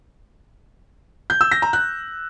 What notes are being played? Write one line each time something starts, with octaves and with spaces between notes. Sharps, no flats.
G6
E6
A#6
A#5
F#6